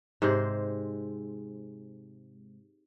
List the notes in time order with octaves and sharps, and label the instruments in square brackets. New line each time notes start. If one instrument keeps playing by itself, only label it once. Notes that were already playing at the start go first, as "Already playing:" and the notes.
[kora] G#2 C3 G#3 C5